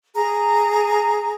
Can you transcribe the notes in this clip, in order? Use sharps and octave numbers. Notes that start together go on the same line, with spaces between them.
G#4 A#5